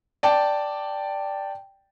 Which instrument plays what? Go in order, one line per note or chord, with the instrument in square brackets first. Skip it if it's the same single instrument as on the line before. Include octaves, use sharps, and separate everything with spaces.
[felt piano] D5 G5 A5